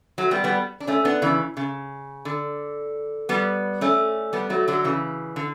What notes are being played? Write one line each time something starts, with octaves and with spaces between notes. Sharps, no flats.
F#3 A3
G3 B3
G3 B3
D4
A3 C#4
B3 D4
C#3 E3
C#3
D3
G3 B3
A3 C#4
G3 B3
F#3 A3
D3 F#3
C#3 E3
D3